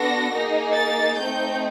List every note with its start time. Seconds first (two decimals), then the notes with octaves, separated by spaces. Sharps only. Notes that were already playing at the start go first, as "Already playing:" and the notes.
Already playing: B3 D4 F#4 A4 A#6
0.32 A#3 D#4 G#4
0.75 A6
1.18 A3 C4 D#4 G6